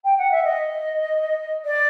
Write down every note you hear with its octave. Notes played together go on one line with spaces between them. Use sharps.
G5
F#5
E5
D#5
D5